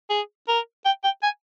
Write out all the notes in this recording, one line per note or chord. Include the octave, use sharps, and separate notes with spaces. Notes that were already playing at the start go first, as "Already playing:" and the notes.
G#4
A#4
G5
G5
G#5